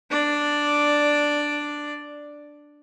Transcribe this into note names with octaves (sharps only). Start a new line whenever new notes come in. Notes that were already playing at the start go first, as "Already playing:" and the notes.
D4 D5